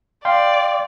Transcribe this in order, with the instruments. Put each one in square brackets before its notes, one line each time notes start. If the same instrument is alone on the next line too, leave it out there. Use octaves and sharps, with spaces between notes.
[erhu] D5 [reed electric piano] F5 G5 C6